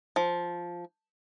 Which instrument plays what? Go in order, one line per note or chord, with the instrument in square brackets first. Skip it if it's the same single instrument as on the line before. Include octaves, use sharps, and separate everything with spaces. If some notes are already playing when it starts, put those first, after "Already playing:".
[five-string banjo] F3